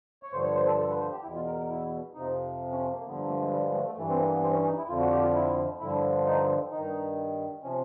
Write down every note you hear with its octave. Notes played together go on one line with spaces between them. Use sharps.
C#5
G2 D3 F3 C5
C#5
C5
A4
A4
B4
C5
G4
E2 B2 E4
F4
A#4
A#4
E4
F2 C3 F3 D#4
C#4
A#3
G2 D3 F3 B3
A#3
A3
G#3
G3
G#3
A3
A3
G2 E3 A3
C4
A#3
B3
C4
C#4
D#4
E4
F2 D3 F3 F4
F#4
G4
F4
E4
G2 D3 F3 E4
D#4
G2 D#3 D#4
C3 F3 C#4